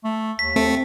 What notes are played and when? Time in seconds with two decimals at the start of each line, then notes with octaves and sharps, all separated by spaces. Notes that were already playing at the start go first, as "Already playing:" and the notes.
0.04 A3
0.39 D#2 B6
0.56 A3 C4